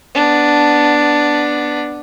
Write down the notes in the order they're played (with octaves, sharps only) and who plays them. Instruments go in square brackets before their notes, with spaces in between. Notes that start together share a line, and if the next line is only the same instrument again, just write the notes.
[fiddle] B3 D4